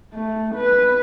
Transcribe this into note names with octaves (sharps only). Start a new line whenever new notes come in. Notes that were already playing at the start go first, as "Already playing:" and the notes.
A3
B4